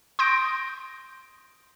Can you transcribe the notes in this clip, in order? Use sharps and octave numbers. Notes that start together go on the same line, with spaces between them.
C6 D#6 G6 A#6 D7